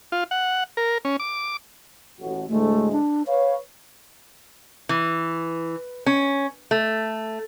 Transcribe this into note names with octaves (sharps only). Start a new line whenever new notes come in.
F4
F#5
A#4
C#4
D6
A1 A2 F#4
D2 A2 G#3 A3
D4
B4 C#5 F5
E3
C#4
A3